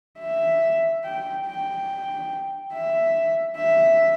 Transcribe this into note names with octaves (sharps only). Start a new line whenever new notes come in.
E5
G5
G5
E5
E5